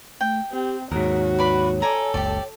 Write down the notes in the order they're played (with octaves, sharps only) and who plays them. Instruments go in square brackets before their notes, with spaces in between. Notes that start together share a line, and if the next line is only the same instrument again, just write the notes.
[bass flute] A3 [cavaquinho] G5
[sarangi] C4 [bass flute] G4
[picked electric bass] D#2 G#2 [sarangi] F#4 [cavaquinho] A#4 [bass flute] C#5
[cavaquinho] B4 D5 B5
[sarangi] A4 [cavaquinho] D5 G#5 A#5
[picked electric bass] F#1 C#2 [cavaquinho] G4 D5